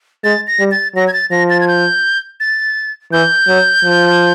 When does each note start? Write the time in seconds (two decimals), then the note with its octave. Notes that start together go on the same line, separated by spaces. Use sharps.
0.24 G#3 A6
0.47 A#6
0.60 G3
0.71 A6
0.96 F#3 A#6
1.07 G#6
1.13 A6
1.31 F3 A#6
1.50 A6
1.61 G#6
1.68 G6
2.40 A6
3.12 E3 G6
3.48 F#3
3.85 F3